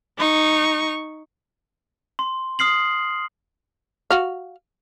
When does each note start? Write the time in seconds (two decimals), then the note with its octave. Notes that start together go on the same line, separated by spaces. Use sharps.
0.18 D#4 C#6
2.19 C6
2.59 D#6 F6 C7 F#7
4.10 F#4 F5